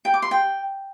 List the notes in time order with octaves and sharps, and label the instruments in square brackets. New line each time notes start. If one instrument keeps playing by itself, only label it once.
[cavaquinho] G5
D6
C6
G5